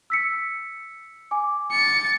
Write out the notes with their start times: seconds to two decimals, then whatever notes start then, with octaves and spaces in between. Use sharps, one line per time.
0.10 E6 B6 C#7
1.31 G#5 D6
1.72 A6 C#7